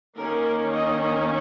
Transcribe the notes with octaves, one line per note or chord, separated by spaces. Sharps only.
D#3 A#3 C#4 A#4
D#5